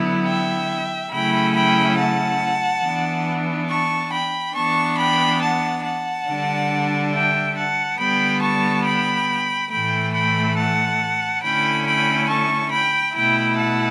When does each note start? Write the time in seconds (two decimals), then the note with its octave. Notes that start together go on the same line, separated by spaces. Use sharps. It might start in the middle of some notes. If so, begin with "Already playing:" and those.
Already playing: D3 F#3 B3 E4
0.25 E5 G5
1.11 C#3 F#3 A3 C#4 E4 G5 B5
1.54 G5 B5
1.97 F#5 A5
2.83 E3 B3 D4
3.70 A5 C#6
4.12 G5 B5
4.55 E3 B3 D4 A5 C#6
4.98 G5 B5
5.41 F#5 A5
5.85 F#5 A5
6.28 D3 G3 D4
7.14 E5 G5
7.56 F#5 A5
7.99 D3 G3 B3 G5 B5
8.42 A5 C#6
8.85 G5 B5
9.71 A2 E3 A3 G5 B5
10.14 G5 B5
10.57 F#5 A5
11.43 D3 A3 C#4 E4 G5 B5
11.87 G5 B5
12.29 A5 C#6
12.72 G5 B5
13.15 B2 A3 E4 G5 B5
13.58 F#5 A5